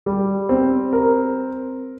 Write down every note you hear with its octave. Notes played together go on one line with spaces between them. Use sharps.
G3
C4
A#4